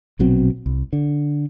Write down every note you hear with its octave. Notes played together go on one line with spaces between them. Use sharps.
A#1 B2 F#3 C4
C2
D3